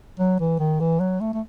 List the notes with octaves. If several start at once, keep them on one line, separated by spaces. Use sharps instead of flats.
F#3
E3
D#3
E3
F#3
A3
A3